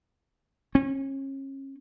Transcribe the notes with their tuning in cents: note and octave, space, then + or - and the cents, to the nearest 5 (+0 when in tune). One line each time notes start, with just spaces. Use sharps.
C#4 -35